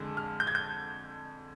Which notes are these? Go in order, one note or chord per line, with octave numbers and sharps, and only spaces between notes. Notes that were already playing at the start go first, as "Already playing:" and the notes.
Already playing: F2 D3 G#3
F6
G6
G#6
G6